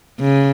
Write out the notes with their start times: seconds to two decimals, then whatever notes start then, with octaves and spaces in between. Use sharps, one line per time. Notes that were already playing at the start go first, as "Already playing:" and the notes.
0.21 C#3